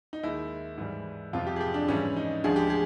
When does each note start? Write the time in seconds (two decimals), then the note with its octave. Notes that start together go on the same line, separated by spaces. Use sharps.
0.13 D#4
0.23 D#2 D#3 G#3 E4
0.78 G#2 E3 G3
1.33 F2 C3 F3 F4
1.46 G4
1.56 G#4
1.61 G4
1.74 D4
1.88 G#2 E3 G3 C#4
2.16 D#4
2.44 D2 D3 F3 G#3 G#4
2.56 G4
2.70 G#4